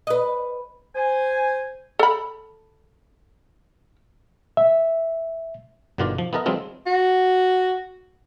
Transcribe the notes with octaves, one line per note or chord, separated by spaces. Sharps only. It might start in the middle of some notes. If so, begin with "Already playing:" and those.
B4 D#5
C5 G#5
A4 B5
E5
G1 B2 D3 D#3 F4 D5
F3
B3 E4 A4 A#4 D#5
E3 F#3 G#3 C4 F4 A4
F#4